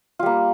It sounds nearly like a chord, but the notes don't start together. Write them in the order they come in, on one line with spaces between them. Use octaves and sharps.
F4 G3 A#3